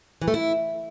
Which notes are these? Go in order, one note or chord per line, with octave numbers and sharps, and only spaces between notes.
E3
A3
E4